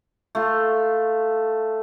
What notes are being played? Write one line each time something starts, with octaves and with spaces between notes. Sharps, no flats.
A3 F4